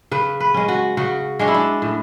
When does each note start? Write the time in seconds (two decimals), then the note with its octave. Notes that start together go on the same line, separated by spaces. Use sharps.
0.11 C#3 B4
0.40 B4
0.54 G#3 C#4
0.68 F#4
0.97 C#3 F#4
1.39 G#3 C#4 D4
1.48 E4
1.54 D4
1.82 A2